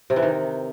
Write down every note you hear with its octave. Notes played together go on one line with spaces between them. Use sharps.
C3
E3
D#3